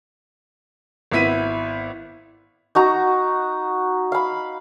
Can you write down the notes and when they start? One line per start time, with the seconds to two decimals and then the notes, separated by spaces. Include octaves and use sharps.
1.12 G#1 B3 E4 B6 D#7
2.75 D#4 F#4 A#5
4.12 F5 B5